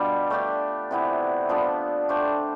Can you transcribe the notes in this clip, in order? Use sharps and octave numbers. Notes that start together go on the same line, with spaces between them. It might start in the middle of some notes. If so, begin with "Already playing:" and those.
Already playing: B2 G3 D4 F4
A3 D4 G4 D5
C3 E3 B3 E4
F3 B3 D4 A4
A3 D4 G4 C5